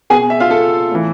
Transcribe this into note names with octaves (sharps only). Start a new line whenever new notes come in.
B2 G#4 G#5
E5
F4 F5
A4 A5
A2 E3